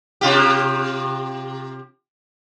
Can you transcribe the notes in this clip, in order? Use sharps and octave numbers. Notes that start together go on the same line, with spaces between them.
C3 F4 G4